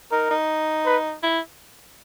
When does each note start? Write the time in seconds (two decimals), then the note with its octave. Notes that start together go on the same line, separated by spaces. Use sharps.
0.11 D#4 A#4
0.31 D#4
0.85 B4
1.23 E4